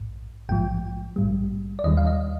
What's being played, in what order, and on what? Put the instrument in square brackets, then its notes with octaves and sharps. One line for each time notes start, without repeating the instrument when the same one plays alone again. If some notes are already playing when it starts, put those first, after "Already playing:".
Already playing: [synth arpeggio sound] A#1 G#2
A#1 G#2 F3 G5
A#1 G#2 G3
D5
D#2 D#3 G3 D#5
F5
D#5